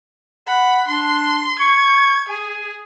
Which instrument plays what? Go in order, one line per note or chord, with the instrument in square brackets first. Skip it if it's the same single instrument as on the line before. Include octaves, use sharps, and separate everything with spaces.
[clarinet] F#5 [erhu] B5
[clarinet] D4 [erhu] C6
[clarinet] C#6 [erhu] G#6
[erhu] G#4 [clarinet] G#5